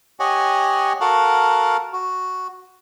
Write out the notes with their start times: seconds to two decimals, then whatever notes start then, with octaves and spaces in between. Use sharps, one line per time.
0.20 G4 C#5 D#5 F#5 G#5
1.00 F#4 A4 A#4 F5 F#5
1.93 F#4